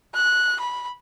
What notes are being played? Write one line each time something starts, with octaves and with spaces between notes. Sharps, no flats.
F#6
B5